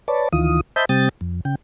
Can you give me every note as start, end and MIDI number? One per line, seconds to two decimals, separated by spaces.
0.08 0.28 71
0.08 0.28 73
0.08 0.28 74
0.08 0.28 81
0.33 0.61 38
0.33 0.61 51
0.33 0.61 52
0.33 0.61 65
0.33 0.61 87
0.76 0.85 72
0.76 0.85 75
0.76 0.85 76
0.76 0.85 81
0.76 0.85 83
0.76 0.85 91
0.89 1.09 48
0.89 1.09 55
0.89 1.09 60
0.89 1.09 79
0.89 1.09 87
0.89 1.09 93
1.21 1.41 41
1.45 1.55 49
1.45 1.55 79